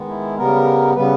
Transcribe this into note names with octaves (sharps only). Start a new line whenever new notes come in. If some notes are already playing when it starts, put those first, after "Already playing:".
Already playing: D#3 G#3 B3
E4
C#3 G3 B3 A#4
C#3 G3 B3 B4